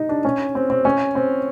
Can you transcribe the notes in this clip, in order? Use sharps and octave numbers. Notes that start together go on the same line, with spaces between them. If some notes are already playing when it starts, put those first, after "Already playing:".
Already playing: D#4
D4
C#4
C4
C4
C#4
C4